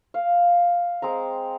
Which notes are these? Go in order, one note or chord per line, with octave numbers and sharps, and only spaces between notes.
F5
G#3 C4 A#5